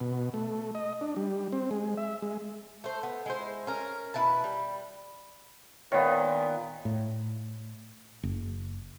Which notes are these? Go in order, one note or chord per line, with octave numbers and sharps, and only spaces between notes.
B2
A3
D#5
D4
G3
C4
G#3
E5
G#3
A3 C5
B3
G#3 E4 C5
C#4 A#4
B2 E4 B4 A5
G3
A#2 D#3 B3 C#5 F5
A2
F#1